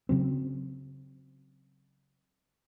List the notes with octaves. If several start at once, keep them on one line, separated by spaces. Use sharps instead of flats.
C#3 F#3 C4